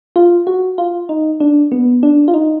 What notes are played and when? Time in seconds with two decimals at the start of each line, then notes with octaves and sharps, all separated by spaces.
0.16 F4
0.47 F#4
0.78 F4
1.09 D#4
1.40 D4
1.72 B3
2.03 D4
2.28 F4
2.34 D#4